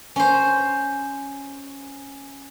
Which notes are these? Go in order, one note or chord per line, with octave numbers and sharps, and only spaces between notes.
C#4 C5